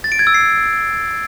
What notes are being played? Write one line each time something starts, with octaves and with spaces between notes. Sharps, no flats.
A6
D7
G#6
E6
C7